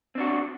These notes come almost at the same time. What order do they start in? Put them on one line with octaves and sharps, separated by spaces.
C4 D4 F#4